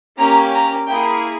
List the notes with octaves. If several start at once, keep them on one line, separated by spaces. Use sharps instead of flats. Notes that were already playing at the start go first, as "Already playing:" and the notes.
A#3 C#4 G4 A#5
A#5
A#3 E4 G#4 G5